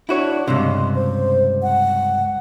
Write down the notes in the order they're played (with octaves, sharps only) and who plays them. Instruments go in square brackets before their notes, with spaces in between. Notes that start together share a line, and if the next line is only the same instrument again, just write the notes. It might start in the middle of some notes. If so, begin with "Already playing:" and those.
[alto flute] D4 [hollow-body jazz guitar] E4 F#4 C#5
[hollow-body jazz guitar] C#2 G2 C3 [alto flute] C6
[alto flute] C5
F#5